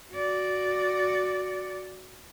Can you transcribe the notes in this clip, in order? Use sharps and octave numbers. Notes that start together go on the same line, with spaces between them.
F#4 D5